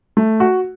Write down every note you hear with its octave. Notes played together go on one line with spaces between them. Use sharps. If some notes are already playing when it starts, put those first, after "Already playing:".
A3
F#4